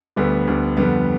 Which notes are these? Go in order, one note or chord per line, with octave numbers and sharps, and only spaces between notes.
D2 D3 G3 B3
D2 D3 G3 B3
F2 D3 G3 B3